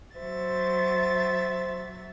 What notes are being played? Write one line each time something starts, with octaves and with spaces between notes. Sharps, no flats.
F#3 C5 E5 A6